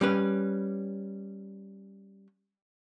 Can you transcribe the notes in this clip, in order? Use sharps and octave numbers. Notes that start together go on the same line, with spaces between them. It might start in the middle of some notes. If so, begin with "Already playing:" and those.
G3 C#4 B4